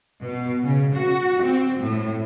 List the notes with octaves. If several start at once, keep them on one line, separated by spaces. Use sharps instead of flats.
B2
C#3
F#4
C4
A2